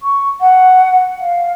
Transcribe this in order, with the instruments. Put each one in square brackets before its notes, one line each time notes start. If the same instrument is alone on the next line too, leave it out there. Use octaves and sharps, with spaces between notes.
[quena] C#6
F#5
F5